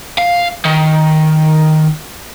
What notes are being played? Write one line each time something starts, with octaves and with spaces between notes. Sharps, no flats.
F5
D#3